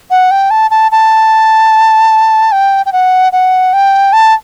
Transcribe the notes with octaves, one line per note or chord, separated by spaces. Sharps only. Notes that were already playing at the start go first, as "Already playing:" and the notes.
F#5
G5
A5
A5
A5
G5
G5
F#5
F#5
G5
A5